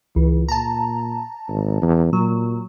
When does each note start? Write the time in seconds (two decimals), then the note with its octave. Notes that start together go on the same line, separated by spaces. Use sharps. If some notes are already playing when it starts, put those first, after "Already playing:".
0.16 C#2 E3
0.49 A#2 A5 A#5
1.48 G#1
1.82 E2
2.13 A#2 F#3